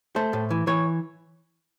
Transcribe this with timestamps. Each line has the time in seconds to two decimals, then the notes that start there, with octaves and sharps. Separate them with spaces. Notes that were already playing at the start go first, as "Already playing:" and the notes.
0.16 A3 C5
0.33 A2
0.50 E3
0.67 E3 C#5